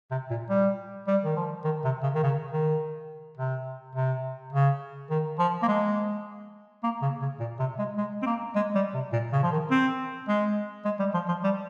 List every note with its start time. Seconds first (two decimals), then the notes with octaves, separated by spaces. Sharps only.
0.11 C3
0.30 A#2
0.50 G3
1.07 G3
1.24 D#3
1.36 F3
1.64 D#3
1.84 C3
2.03 C#3
2.15 D#3
2.23 C#3
2.51 D#3
3.37 C3
3.95 C3
4.52 C#3
5.10 D#3
5.39 F3
5.62 A#3
5.68 G#3
6.83 A#3
7.02 C#3
7.21 C#3
7.40 A#2
7.60 C3
7.79 G#3
7.97 G#3
8.22 C4
8.26 A#3
8.55 G#3
8.75 G3
8.94 C3
9.13 A#2
9.33 C#3
9.43 F3
9.52 D#3
9.71 C4
10.28 G#3
10.85 G#3
11.00 G3
11.14 F3
11.28 F3
11.44 G3